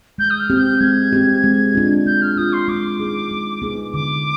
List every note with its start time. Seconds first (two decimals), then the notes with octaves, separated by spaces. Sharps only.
0.18 G#3 G6
0.30 D#6
0.39 F6
0.50 C4 G4
0.60 G6
0.80 G#3 G#6
1.13 C4 G4
1.44 G#3
1.75 D4 F4
2.06 G#3 G6
2.22 F6
2.37 D4 F4 D#6
2.53 C6
2.68 G#3 D6
3.00 B3 D#4 G#4
3.31 G#3
3.62 B3 D#4 G#4
3.94 D3 D6